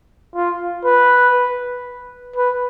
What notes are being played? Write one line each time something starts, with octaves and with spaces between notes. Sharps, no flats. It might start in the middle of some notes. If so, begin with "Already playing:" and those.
F4
B4
B4